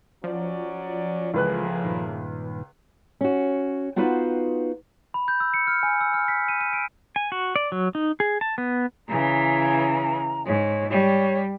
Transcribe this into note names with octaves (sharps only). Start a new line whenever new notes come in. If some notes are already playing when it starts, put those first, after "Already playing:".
F3 F#3 C#4 D5
C#2 A2 E3 G#3 A#3 G#4 B4 F#6
G2 A#2 D#3
C#4 F#4
B3 D#4 F4 F#4 B4 C5
B5
G6
E6
C#7
F6
G#5
E6
F6
B6
D#7
D#7
D7
G#5
F#4
D5
F#3
D#4
G#4
A5
B3
C#3 E3 A#5
G#2 C#5
G3 C#5